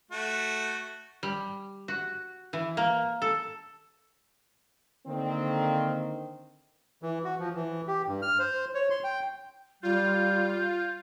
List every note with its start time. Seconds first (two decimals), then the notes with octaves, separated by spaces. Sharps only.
0.11 A3 F#4
1.23 G3
1.88 F#4
2.53 E3
2.77 A#3
3.22 A4
5.07 D3 D#3 A#3 C4
7.03 E3
7.24 F#4
7.39 F3
7.55 E3
7.88 G4
8.08 G2
8.22 F6
8.39 C5
8.75 C#5
8.90 C6
9.04 G5
9.83 G3 F4 G6